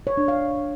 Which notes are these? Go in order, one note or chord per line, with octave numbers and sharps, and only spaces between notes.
C#5
D4
F5